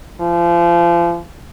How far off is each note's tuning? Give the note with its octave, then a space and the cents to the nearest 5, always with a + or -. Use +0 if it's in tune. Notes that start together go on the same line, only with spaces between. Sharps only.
F3 -30